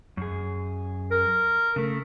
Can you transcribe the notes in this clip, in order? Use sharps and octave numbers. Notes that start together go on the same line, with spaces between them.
F#2 G#4
A#4
C#3 A3